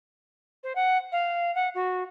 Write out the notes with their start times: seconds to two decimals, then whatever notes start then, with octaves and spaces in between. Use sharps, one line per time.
0.64 C5
0.75 F#5
1.12 F5
1.55 F#5
1.75 F#4